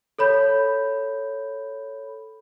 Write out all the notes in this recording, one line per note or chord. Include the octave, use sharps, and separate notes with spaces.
A4 C#5 B5 G6